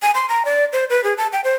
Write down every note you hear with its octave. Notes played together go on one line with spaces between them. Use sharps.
G#5
C6
A#5
D5
C5
B4
G#4
A5
G5
C5